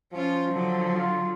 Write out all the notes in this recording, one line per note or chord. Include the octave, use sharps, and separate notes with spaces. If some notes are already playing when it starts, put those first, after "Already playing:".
F3 C#4 F4
D3 F#3
F4